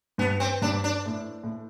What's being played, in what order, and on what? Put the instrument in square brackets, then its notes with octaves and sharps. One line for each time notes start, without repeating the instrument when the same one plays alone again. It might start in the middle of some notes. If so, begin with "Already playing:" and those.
[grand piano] G2 [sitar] B3
[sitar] C4
[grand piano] G2 [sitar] D4
[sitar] D4
[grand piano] A2
A2